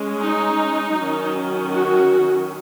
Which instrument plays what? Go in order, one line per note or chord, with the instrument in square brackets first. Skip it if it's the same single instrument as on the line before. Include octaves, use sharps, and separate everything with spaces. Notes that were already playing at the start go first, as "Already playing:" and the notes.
Already playing: [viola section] G#3 C#4
D#4
D#3 F#3 C#4
F#4